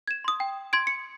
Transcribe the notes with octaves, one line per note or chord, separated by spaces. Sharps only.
G#6 E7
C6 D#6
G5
C6 G#6 D7
C#7